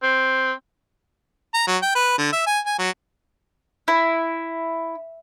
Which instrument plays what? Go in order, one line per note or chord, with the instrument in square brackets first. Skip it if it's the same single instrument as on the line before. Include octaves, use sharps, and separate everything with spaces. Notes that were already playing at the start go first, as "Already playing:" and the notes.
[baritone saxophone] C4
[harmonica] A#5
F#3
G5
B4
D3
E5
G#5
G#5
F#3
[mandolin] E4